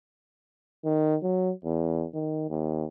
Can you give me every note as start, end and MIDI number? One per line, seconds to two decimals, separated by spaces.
0.85 1.16 51
1.23 1.52 54
1.65 2.06 40
2.14 2.45 51
2.50 2.86 39